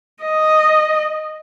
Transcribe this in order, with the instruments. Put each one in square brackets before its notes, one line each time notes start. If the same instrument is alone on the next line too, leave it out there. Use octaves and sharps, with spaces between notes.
[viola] D#5